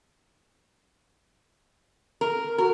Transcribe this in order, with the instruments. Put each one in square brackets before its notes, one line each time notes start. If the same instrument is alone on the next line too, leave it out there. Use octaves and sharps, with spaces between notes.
[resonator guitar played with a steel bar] A#4
[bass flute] F#4 [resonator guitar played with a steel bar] A#4